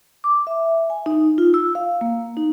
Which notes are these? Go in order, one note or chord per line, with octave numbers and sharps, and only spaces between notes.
D6
E5
G#5
D#4
F4
E6
F5
A#3
D#4